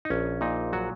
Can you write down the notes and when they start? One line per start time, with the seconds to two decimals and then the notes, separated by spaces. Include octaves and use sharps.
0.05 D#4
0.10 A#1 C#4
0.41 A#2 D#4
0.73 F#3 F#4